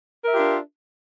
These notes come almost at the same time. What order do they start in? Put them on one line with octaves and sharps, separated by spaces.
A#4 E5 G4 F4 D4